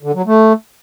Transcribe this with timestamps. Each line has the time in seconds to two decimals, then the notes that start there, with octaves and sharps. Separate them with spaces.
0.03 D3
0.15 F#3
0.26 A3